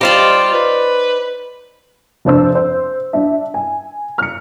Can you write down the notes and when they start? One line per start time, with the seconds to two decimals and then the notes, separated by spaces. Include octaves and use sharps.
0.01 G3 D#4 F4 G4 C5 D5
0.54 B4
2.25 F1 D4 C5 E6
2.55 C5
3.13 D4 E5
3.54 G#5
4.18 F6 C#7